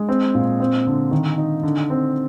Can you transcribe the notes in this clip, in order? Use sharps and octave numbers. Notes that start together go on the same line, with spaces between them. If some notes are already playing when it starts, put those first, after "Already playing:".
Already playing: G#3
C4
A#2
C4
D3
D#3
D#4
D3
C4